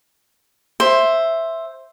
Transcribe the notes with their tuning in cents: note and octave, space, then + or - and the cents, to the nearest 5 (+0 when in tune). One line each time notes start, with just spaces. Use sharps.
C5 +10 E5 +0